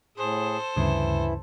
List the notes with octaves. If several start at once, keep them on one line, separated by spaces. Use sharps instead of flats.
A2 G#4 A4 C5
D2 G2 C#3 E3 E4